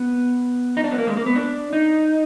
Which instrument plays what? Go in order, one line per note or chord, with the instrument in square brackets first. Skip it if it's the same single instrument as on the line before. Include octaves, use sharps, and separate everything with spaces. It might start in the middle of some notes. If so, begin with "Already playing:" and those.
Already playing: [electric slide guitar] B3
D#4
D4
B3
A#3
G#3
A#3
B3
D4
D#4